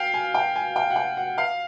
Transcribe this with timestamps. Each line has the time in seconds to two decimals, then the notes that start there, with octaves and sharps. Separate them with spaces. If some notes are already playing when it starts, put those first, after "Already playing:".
Already playing: F5 G5
0.14 G#5
0.34 G5
0.56 G#5
0.76 G5
0.90 F#5
0.96 G5
1.17 F#5
1.38 F5